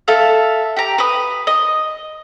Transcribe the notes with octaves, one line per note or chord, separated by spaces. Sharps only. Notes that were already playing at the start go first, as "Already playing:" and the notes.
A4 E5 F5
G4 A#5
B4 D#6
D#5